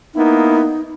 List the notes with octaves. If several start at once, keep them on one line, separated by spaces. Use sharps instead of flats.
A#3 B3 D#4 E4